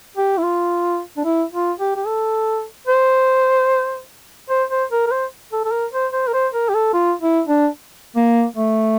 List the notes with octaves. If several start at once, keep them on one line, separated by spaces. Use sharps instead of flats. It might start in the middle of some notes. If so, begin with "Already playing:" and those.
G4
E4
F4
D4
E4
F4
G4
G4
A4
C5
C5
C5
A#4
A#4
C5
A4
A4
A#4
C5
C5
A#4
C5
A#4
G4
A4
F4
E4
D4
A#3
A3